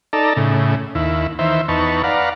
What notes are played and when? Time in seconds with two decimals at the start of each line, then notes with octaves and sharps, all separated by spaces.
0.13 D#4 A4 D5 A5 A#5
0.37 A2 C#3
0.95 D#2 E4
1.39 D#3 E3 C5 E5
1.68 E2 D#4 B4 A5 C#6
2.04 B4 D5 F5 F#5 A#5